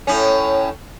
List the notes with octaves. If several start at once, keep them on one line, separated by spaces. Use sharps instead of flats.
A2 C#4